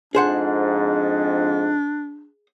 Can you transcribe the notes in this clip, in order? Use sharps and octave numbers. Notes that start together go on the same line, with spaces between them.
F2 G#2 D4 G#4 C5 F#5